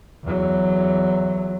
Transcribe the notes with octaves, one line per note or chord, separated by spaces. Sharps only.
E2 F#3